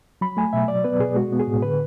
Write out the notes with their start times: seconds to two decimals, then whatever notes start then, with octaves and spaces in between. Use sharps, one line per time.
0.21 F#3 B5
0.37 A3 G#5
0.53 B2 E5
0.68 F#3 D5
0.84 B3 B4
1.00 B2 G#4
1.15 G#3 F#4
1.32 B3
1.39 G#4
1.48 A2
1.62 D3 B4